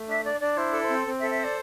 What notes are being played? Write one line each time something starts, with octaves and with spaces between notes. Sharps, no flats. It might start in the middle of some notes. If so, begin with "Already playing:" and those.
Already playing: A3
D4 E5
D4 D5
D4 D5
E4 C5
A4
C5
C4
C4
E5
A4
E5
C5 D5